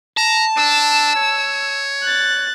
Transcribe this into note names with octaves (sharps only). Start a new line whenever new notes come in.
A5 A#5
D4 E6
C#5
F#6 A6